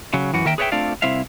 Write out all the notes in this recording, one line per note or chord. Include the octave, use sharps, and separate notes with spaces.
C#3 F#3
F#2 E3 F#4
D#2 D#3 A#4 E5 G5
G#4 B4 C#5 D5 E5 G5
A3 C4 D4 F4 D5 F5
C2 C4 E4 E5 F5